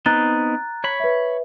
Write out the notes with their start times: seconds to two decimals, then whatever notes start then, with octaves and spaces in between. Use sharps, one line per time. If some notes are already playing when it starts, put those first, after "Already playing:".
0.06 B3 C4 D#4 A#5 F#6 A6
0.84 C#5 B5
1.00 B4 E5